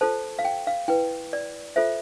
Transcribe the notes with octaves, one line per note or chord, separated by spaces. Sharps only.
F4 A4 C5 A5
F5
G5
F5
E4 B4 G5
D5
F4 A4 C5 E5